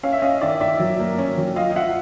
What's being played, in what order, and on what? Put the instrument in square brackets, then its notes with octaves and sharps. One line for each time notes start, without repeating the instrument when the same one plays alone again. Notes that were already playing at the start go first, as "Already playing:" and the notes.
[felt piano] C#4 [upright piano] F5
[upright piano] E5
[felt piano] C#4 [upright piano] D#5 F5
[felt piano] D#3 [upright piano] D5 E5
[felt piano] D#3 [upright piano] D5 E5
[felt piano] F#3
A#3
C#4
F#3
[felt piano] F4 [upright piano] D#5 F5
[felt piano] F4 [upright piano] E5 F#5